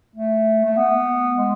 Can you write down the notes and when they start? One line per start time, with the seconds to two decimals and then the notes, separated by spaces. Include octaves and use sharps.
0.16 A3
0.64 A3
0.77 B3
1.36 G#3